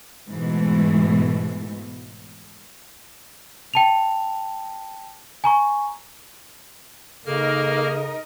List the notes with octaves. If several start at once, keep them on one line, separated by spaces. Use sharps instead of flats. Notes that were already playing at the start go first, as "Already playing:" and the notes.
G#2 B2 E3 G#3 A3
G5 A5 F7
G#5 A#5 C#6
C#3 A#3 D#4 A4 A#4 D#5 F6